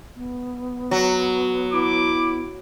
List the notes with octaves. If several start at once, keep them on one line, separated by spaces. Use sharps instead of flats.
B3
F#3 F#4
E4 D6